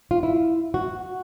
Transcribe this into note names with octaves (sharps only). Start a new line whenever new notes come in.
F4
E4
F#4